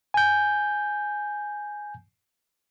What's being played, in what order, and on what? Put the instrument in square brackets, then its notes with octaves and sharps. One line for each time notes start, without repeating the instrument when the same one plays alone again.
[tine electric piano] G#5 G6